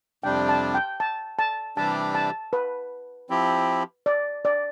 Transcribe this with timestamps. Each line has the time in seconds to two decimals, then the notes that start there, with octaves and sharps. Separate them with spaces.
0.23 F2 C3 G3 D4 G5
0.49 A5
0.75 G5
1.00 A5
1.39 A5
1.77 C3 E3 G3 D4 G4 A5
2.15 A5
2.53 B4
3.30 F3 C4 E4 G4
4.06 D5
4.45 D5